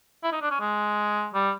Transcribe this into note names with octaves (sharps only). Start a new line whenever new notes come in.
E4
D#4
D4
C#4
G#3
G3